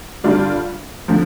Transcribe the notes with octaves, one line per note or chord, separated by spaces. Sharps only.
G2 D3 G3 D4 F4
D3 F3